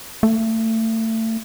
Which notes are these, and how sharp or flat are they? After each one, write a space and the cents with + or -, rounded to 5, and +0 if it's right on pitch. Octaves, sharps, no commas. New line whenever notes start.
A3 +30